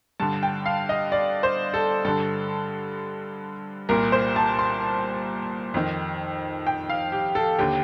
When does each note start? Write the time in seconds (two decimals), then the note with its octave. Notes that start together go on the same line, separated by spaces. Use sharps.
0.20 G2 D3 A5
0.43 G5
0.66 F5
0.89 D#5
1.12 D5
1.43 C5
1.74 A4
2.05 G2 D3 A4
3.89 C2 A#2 A#4
4.12 C5
4.36 A5
4.59 C6
5.74 F2 D#3
6.67 G5
6.90 F5
7.12 G4
7.35 A4
7.59 D#2 D3 G4